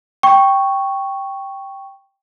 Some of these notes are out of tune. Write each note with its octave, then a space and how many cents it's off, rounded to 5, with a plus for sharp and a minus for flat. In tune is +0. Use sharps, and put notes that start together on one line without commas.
G5 +0 C#6 +0